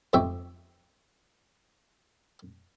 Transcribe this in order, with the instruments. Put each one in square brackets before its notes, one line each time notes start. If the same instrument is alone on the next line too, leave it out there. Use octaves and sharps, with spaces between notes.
[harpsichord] F2 G#2 C3 E5 G5 C#6